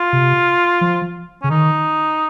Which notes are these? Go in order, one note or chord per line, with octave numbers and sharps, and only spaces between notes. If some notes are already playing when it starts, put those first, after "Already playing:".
Already playing: F4
C3
F3
C#3 C#4
D#3 D#4